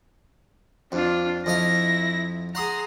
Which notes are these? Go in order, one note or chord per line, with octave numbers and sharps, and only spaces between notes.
F2 D4 F4
F2 E4 D#5 F5 A#6
G#4 F#5 A#5 C6 D#6